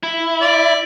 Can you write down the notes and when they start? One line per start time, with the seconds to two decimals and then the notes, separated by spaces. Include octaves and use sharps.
0.03 E4
0.41 D5